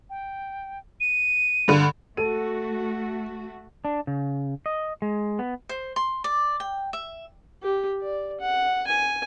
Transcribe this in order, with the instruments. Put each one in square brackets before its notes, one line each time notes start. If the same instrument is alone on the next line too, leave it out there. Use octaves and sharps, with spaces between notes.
[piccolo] G5
D#7
[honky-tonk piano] G2 D3
[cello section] A3 F#4 [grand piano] A4 D#7
[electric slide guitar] D4
C#3
D#5
G#3
B3
[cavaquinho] C5
C6
D5
G5
E5
[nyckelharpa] G4
D5
F#5
G#5